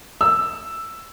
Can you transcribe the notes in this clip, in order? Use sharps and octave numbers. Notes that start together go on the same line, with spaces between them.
E6